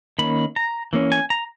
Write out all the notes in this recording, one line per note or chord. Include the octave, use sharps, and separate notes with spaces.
D#3 A#3 C#4 B5
A#5
E3 A#3 C#4
G#5
A#5